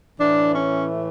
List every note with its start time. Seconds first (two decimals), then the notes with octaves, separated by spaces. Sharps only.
0.18 A2 E3 A3 D4
0.54 C#4